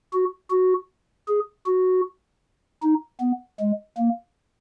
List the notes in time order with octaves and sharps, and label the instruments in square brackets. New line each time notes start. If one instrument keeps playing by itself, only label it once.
[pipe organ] F#4
F#4
G#4
F#4
D#4
B3
G#3
A#3